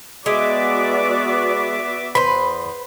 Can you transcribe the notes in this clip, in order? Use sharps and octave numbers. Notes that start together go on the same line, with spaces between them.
G#3 B3 F#4 D5 E5 D6
E2 B4 C5 B5